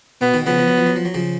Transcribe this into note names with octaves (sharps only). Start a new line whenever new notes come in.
B2 B3
B2 D#3
C#3 F3 B3
F3
F#3
F3
F#3
F3
F#3
C#3 F3